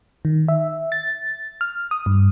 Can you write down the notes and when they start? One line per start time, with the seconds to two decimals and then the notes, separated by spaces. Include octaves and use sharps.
0.25 D#3
0.48 E5
0.92 A6
1.61 F6
1.91 D#6
2.06 G2